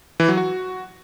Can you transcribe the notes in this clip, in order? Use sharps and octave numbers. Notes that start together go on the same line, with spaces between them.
E3
F#3
F#4